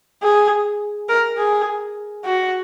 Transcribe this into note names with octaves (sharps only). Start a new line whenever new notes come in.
G#4
A#4
G#4
F#4